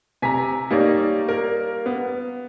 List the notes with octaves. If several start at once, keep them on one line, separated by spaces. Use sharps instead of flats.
C3 G#5 A#5 B6
G3 A#3 D#4 C#5 D5
A#4
B3